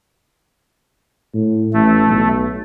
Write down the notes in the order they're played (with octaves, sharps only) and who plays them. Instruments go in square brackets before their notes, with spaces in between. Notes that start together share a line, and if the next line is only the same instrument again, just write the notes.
[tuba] A2
[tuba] A1 [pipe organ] A3
[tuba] B1